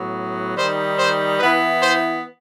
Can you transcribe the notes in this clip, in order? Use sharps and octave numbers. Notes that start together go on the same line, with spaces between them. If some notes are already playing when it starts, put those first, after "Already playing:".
Already playing: A2 F#3 B3
D#3 G3 D#4 C5
C5
E3 B3 E4 B4
C5